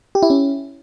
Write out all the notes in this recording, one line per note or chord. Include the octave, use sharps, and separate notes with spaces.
G4
E4
C#4